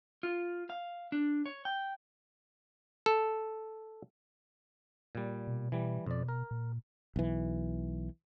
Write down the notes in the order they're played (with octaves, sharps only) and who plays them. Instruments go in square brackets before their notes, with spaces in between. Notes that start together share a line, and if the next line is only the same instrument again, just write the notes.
[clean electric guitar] F4
F5
D4
C#5
G5
[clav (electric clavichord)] A4
A#2 G3
[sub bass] B2
[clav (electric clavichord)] E3 G3
[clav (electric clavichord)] F2 D5 [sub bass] B2
[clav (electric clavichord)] A#4
[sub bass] A#2
[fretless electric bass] B1 E3